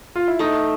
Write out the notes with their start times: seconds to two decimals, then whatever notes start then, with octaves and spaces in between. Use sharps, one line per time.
0.16 F4
0.28 E4
0.39 A3 D#4